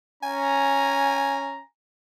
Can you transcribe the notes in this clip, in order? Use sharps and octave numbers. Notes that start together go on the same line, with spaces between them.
C#4 G#5 A#5